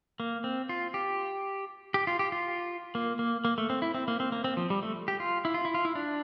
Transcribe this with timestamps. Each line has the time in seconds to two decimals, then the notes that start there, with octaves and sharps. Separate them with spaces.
0.20 A#3
0.44 C4
0.69 F4
0.94 G4
1.94 G4
2.07 F4
2.19 G4
2.32 F4
2.95 A#3
3.19 A#3
3.45 A#3
3.58 A3
3.70 C4
3.82 E4
3.94 C4
4.08 A#3
4.20 C4
4.32 A#3
4.44 C4
4.57 F3
4.70 G3
4.83 A3
5.08 G4
5.20 F4
5.45 E4
5.54 F4
5.65 E4
5.74 F4
5.85 E4
5.95 D4